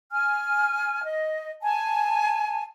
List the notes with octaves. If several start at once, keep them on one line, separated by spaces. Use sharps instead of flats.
G#5 F6
D#5
G#5 A5